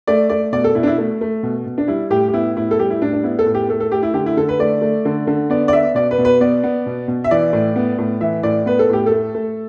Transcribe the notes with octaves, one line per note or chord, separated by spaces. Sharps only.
A3 D5
A3 D5
B2 D5
A4
B2 E4
D4
E4
A3
A3
B2
B2
D4
G3 E4
A2 G4
G4
B3 E4
A2 E4
A4
G3 G4
E4
A2 D4
D4
B3 E4
A4
A2
G4
A3 A4
A4
A3 G4
E4
D3 G4
E4
D3 A4
B4
A3 D5
A3
D3
D3
B3 D5
D5
B3 E5
B2 D5
B4
B2
B4
B3 D5
B3
B2
B2
E5
E3 D5
A2
B3
A2
E3 E5
A2 D5
B3 B4
A4
A2 G4
A4
A3
A3